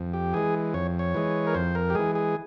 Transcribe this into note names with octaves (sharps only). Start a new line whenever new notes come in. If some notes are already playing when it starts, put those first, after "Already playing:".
Already playing: F2
G4
E3 G#3 G#4
F2 C#5
C#5
E3 G#3
A#4
F2 C5
A#4
G4
E3 G#3 G#4
G#4